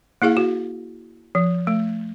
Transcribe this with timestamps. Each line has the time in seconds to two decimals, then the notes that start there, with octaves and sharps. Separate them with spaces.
0.22 A#3 E4 G#4 F5
0.37 F#4
1.35 F3
1.67 A3